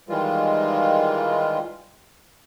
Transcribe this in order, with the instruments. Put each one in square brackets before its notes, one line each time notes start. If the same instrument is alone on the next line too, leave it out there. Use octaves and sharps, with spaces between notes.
[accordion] D#3 E3 G3 G#3 F4